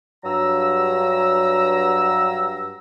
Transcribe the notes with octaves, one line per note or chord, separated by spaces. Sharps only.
G2 F#3 A#5 E6